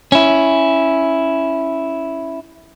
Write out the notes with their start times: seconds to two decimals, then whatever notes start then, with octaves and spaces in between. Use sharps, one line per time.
0.12 C#4 E4